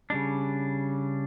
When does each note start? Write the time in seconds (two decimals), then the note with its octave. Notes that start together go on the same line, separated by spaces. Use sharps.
0.10 C#3 G3 D4